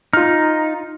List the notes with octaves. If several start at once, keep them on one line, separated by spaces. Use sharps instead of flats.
D#4 F4 F6